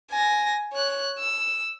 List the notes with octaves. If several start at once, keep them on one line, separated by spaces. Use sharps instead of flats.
G#5 A#6
C#5 F#6
E6